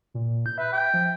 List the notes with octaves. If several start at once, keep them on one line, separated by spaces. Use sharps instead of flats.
A#2
G6
B4 E5
G5
F3